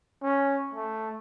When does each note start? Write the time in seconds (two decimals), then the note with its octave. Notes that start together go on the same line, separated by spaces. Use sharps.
0.23 C#4
0.74 A3